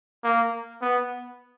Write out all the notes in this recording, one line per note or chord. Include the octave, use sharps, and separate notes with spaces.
A#3
B3